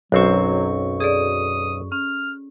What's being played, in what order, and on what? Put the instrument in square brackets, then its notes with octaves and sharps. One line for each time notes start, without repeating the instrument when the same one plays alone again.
[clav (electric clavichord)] B1 C4 C5 [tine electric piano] F#2 C#6 [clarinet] F#3 [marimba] F#4
[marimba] G#4 A4 D5 [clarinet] D#6
[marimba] C#4 [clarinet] F6